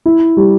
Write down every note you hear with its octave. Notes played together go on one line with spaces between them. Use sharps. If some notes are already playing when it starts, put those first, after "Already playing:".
E4
G3